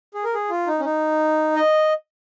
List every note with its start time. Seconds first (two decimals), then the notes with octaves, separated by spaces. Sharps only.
0.14 G#4
0.24 A#4
0.34 G#4
0.50 F4
0.67 D#4
0.80 C#4
0.85 D#4
1.56 D#5